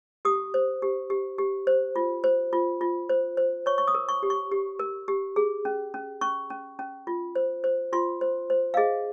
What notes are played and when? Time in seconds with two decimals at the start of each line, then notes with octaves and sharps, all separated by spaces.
0.25 G4 D#6
0.54 C5
0.82 G4
1.10 G4
1.38 G4
1.67 C5
1.96 F4
2.24 C5
2.53 F4
2.81 F4
3.09 C5
3.37 C5
3.66 C#5 C#6
3.78 C#6
3.88 D#6
3.95 A#4
4.09 C#6
4.23 G4
4.30 C#6
4.52 G4
4.79 A#4
5.08 G4
5.36 G#4
5.65 C#4
5.94 C#4
6.21 C#4 C#6
6.50 C#4
6.79 C#4
7.07 F4
7.35 C5
7.64 C5
7.93 F4 C6
8.21 C5
8.50 C5
8.74 F5
8.77 G#4 D#5